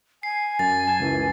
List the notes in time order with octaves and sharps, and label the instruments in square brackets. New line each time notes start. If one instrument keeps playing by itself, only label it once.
[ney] G#5 [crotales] C7
[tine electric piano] F#2 [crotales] A6
[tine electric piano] A5 G#6
C#2 F#2 E3